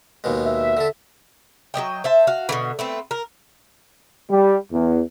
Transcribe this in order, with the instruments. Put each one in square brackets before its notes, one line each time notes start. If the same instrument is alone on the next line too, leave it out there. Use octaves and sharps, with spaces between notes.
[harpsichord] D#2 B2 G#3
[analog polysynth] E5
[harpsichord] D3 A4
[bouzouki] F#3 B3 D#5 G5
C5 E5 A5
F#4 F5
B2 D3 E3
A3 B3 C4
A#4
[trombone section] G3
E2